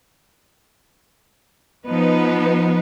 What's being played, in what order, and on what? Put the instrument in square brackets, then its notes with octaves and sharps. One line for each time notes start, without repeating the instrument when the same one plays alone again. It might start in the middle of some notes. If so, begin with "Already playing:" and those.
[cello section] F3 B3 D#4 B4